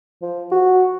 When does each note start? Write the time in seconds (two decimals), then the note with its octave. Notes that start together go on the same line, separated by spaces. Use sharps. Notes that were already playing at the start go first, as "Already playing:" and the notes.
0.22 F3
0.52 F#4